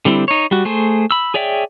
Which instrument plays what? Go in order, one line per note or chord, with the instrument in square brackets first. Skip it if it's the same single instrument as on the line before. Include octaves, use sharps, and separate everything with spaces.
[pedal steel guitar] D3 G3 C4 E4
D#4 C#5
G3 F#4
A3 G#4 C5
B5 E6
G#4 C#5 D5 E5 G5